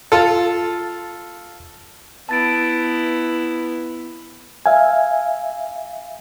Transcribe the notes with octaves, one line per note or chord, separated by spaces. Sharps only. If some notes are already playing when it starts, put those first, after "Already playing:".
F4 A4
B3 E4 A5 A6 D7
E5 F5 G#5